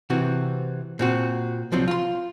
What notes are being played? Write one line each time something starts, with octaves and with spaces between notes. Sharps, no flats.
C3 E3 C4 F#4
A#2 C4 F#4
C2 F3 F#3 C4
F4 C6